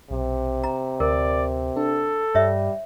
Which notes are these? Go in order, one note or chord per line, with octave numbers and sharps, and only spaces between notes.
B1 C3
A#5
D2 A#4 D5
D4 A4
G2 G3 C#5 E5